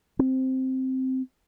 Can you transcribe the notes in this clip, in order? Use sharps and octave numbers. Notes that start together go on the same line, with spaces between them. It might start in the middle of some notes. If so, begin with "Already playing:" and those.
C4